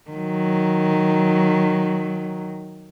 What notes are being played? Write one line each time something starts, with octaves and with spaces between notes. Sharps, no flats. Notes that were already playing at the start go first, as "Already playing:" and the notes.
D#3 F#3